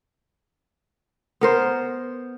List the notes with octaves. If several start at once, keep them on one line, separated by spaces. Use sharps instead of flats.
B3 A#4 C5